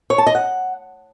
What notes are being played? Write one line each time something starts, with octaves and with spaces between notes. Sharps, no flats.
C#5
A5
D#5
F#5